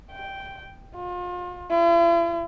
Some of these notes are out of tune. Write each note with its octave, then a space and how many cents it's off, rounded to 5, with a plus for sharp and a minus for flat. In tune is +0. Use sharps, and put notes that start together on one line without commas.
G5 -5
F4 +35
E4 +45